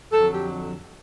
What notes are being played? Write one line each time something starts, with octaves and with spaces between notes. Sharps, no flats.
F2 D3 F#3 A4
G4